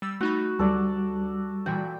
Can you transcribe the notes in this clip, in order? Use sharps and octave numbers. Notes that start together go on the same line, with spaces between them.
G3 E6 A6
A3 D#4 F#4 B5
D2 F#3 G3 A4 D5
A#2 E3 F#4 G5